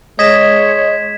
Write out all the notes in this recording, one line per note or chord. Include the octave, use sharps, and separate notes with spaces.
G#3 C#5 D#5 G#6 B6 E7